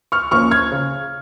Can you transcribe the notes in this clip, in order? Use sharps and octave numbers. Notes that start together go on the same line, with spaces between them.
C#6 F6
F3 A#3 C#4 C#6 F6
F6 G#6
C#3